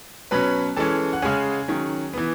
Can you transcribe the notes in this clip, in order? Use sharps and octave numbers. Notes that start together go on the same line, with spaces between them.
B2 F#3 C#4 B4 B5
E3 G#3 C#4 A4 A5
F#5
C#3 G#3 C#4 G#4 G#5
D#3 F#3 C#4
E3 B3